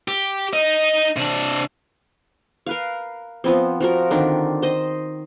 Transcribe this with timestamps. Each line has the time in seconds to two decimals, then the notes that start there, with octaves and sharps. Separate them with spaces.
0.08 G4
0.53 D#4 D#5
1.16 C3 D4
2.66 A#4 B4 F5
3.44 F3 B3 C4
3.81 F3 F#4 A#4
4.11 D3 D#3 C4 D4
4.62 C5 D#5